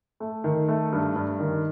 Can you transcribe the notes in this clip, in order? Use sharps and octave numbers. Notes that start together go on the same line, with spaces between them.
A3
D#3
A3
G2
G2
D#3